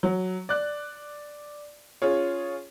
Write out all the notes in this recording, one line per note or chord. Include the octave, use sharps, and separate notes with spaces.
F#3
D5 F#6
C#4 F4 G#4 C#5